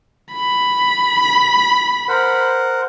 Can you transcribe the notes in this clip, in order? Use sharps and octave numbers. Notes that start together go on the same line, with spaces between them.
B5
A#4 C5 F#5